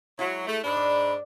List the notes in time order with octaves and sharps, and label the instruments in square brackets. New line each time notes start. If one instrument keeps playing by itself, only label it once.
[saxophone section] F#3 [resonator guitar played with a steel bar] G#3 E4
[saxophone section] A3 [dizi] G#4
[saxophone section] G#2 D4 [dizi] B5
[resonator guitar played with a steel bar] D5